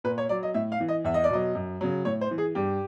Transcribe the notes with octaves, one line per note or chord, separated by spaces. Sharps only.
A#2 B4
C#5
F#3 D5
D#5
A2 E5
F5
E3
D#5
E2 E5
D#5
D5
B2 F#3 D#5
F#2
C#3 F#3
A2 C#5
C5
E3
G#4
G2 G4